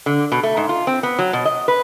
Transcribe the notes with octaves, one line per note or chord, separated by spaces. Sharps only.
D3
B2
A3
G#2
F4
C4
B3
F#3
B2
D#5
B4